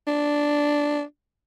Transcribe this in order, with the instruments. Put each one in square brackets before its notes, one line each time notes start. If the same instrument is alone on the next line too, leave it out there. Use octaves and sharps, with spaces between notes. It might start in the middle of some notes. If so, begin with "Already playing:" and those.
[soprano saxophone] D4